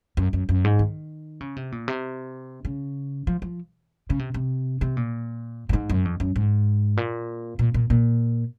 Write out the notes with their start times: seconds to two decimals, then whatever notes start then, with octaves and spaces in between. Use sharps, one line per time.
0.17 F#2
0.33 F#2
0.49 F#2
0.64 G#2
0.79 D#3
1.41 C#3
1.56 C3
1.72 A#2
1.88 C3
2.65 C#3
3.27 F3
3.42 F3
4.10 C#3
4.19 C3
4.34 C3
4.81 C3
4.97 A#2
5.69 A#2
5.73 G#2
5.90 F#2
6.05 F2
6.20 F#2
6.36 G#2
6.97 A#2
7.59 A#2
7.74 A#2
7.90 A#2